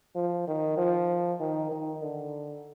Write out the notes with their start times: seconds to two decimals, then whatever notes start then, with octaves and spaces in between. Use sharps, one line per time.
0.15 F3
0.47 D#3
0.78 F3
1.40 D#3
1.72 D#3
2.02 D3